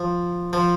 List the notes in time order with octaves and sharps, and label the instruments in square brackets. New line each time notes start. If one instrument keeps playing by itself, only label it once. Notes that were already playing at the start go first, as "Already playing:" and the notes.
Already playing: [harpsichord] F3
F3